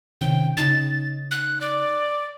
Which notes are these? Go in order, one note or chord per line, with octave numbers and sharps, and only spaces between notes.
C3 D#3 C#4 G5
C#3 D#4 A6
F#6
D5